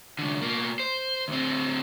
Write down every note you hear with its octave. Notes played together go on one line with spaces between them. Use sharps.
C2 D3
B2 A#3
C5
D2 C4